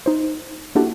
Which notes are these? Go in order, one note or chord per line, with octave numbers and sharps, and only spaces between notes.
D#4 C5
A#3 D4 E4 F#4 G4 A4